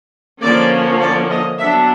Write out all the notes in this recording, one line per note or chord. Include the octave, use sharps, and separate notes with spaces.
D3 F3 A#3 C#4 D5
D5
D#5
F#3 B3 D4 E5